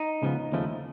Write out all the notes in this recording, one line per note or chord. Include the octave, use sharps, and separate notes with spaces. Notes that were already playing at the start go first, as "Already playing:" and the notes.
Already playing: D#4
C#2 C#3 F3 G#3 B3
D#2 C#3 F3 A3